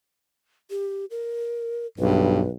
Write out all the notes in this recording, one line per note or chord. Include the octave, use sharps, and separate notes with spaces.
G4
A#4
B1 G2 B4